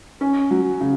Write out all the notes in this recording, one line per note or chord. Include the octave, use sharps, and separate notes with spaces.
C#4
F#3
C#3